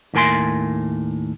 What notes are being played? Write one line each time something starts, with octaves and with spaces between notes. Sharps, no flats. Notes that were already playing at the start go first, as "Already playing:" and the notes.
D#2 A2 A#4 G#5 C6